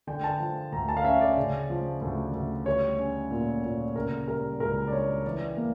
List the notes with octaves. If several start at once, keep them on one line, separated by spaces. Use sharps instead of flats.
D3 G5
A5
F3
D2 A#5
A5
F5
C#4 E5
D5
C#3
F3
D2
D2
G3 C#5
C#4
A#2
A#2
C#3 A#4
G3 A#4
C#2 A#4
D5
D4 C#5
E3 D5
A#3